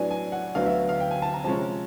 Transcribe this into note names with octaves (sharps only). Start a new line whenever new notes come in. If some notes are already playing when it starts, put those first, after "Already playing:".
Already playing: A2 F#3 B3 D4 G#5
G#5
F#5
D2 D3 F#3 B3 F5
E5
F5
G5
G#5
A5
A#5
C3 F3 G#3 C#4 A5